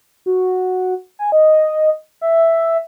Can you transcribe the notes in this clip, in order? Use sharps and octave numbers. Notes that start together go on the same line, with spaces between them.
F#4
G#5
D#5
E5